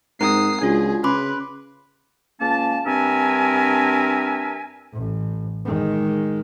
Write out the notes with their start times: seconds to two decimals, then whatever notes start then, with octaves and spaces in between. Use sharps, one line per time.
0.21 G#2 C4 A#4 A#5 D#6 C7
0.62 C#2 D4 F4 F#4 G#4
1.04 C#3 B4 B5 C6 D6
2.41 C#2 A#3 C#4 A5
2.86 G2 C4 D4 A#4 E5 G#5
4.93 A1
5.65 D#3 G#3